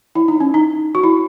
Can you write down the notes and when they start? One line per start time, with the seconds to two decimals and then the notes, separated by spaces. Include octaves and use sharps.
0.15 E4
0.28 D#4
0.40 C#4
0.54 D#4
0.95 F#4
1.04 E4